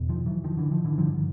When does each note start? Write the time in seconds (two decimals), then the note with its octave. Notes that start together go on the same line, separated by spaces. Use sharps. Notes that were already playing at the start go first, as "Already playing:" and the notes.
Already playing: E2 B2
0.09 D#3 F3
0.26 E3 F#3
0.44 D#3 F3
0.57 D3 E3
0.71 D#3 F3
0.84 D3 E3
0.98 G2 D3 D#3 F3